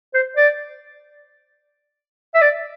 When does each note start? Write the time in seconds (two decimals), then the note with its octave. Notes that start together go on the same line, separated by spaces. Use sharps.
0.14 C5
0.37 D5
2.35 E5
2.42 D5